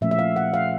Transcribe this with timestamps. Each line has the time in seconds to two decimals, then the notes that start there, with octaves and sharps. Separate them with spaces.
0.01 A#2 F3 A3 C#4 E5
0.11 E5
0.19 F5
0.36 F#5
0.54 F5